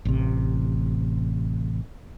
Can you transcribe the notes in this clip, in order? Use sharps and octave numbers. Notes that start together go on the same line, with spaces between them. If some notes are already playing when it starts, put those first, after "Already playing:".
A1 C3